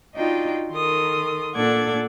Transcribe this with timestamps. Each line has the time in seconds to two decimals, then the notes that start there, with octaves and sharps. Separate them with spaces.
0.15 D4 D#4 F4 F#4 D#5 G5
0.70 D#3 A4 A#4 C6 D#6
1.54 A#2 D4 A4 F#5 D6 G#6